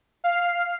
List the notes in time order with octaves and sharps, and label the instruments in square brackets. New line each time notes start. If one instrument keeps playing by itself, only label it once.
[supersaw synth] F5